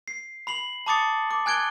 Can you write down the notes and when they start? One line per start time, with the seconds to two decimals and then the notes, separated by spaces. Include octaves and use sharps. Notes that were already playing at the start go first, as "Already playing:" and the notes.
0.08 C7
0.47 B5 C7 F#7
0.86 A5 B5 D6 D#6 A6 C#7
1.31 D6
1.46 G#5 F#6 G#6 D7 G7